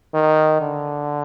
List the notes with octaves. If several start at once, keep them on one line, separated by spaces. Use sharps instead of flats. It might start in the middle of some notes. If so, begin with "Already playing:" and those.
D#3
D3